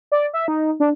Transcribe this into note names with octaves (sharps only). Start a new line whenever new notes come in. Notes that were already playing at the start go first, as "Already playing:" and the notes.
D5
E5
D#4
D4